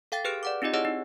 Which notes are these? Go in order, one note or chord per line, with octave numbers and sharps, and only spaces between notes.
A4 F5 G5 A6
G4 G#4 B4 F6 F#6 D7
D5 F#5 D6
C4 D#4 F4 G4 D#5
E4 G#4 C#5 D#5 F#5 E6
D#4